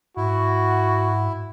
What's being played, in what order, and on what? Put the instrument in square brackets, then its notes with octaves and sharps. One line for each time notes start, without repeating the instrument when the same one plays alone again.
[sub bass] G#2 [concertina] E4 [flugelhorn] F#4